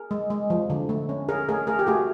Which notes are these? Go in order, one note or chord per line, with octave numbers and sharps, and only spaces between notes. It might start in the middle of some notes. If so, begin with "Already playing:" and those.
Already playing: G#4 A#4
G#3
G#3
F3
D3
A3
C#4
C#4 G#4 A#4
A3 G#4 A#4
A3 G#4 A#4
G4
A3 F#4 G#4